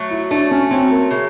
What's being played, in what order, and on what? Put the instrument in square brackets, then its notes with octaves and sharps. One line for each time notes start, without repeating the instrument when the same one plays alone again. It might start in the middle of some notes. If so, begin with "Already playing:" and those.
Already playing: [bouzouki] F#3 A3
[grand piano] E4
[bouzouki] A3 [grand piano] D4
[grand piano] C#4
[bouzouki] F#3 [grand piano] C4
[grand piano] A#3
[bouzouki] C#3